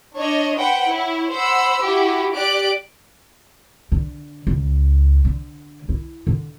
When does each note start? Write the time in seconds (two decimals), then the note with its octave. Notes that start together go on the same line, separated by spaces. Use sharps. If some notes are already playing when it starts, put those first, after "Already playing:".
0.16 D4 C#5 D#5
0.58 B4 C5 F#5 G5
0.88 E4 C#5
1.32 C5 F#5 B5 E6
1.82 E4 F#4 G4
2.34 G4 D5 F#6 D7
3.92 D3
4.47 C#2
5.25 D3
5.89 E4
6.27 D3